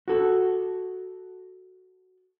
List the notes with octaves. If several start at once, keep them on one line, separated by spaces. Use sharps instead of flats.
F#4 A4